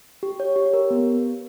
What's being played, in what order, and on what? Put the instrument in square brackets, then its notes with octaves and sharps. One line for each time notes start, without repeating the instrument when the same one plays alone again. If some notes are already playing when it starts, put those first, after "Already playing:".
[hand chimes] G4
C#5
G4
A#4
B3